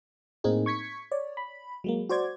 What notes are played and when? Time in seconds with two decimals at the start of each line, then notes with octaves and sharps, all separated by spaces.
0.44 A2 A#3 C4 D#4 G#4
0.66 C#6 G#6 B6 C#7
1.12 C#5 D5
1.37 B5
1.84 F#3 G#3 A#3
2.09 F#4 C5 D5 G#6